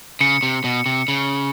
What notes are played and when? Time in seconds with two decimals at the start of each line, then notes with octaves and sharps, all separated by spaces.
0.21 C#3 C#7
0.43 C3
0.64 B2
0.86 C3
1.08 C#3